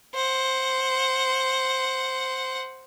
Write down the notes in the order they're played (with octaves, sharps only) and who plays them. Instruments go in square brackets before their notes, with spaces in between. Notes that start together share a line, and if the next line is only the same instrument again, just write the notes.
[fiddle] C5 F#5